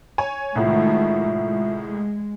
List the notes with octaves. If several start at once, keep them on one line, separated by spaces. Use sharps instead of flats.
C#5 G#5
C2 A2 D#3 G#3 A3 F4 E5
G#3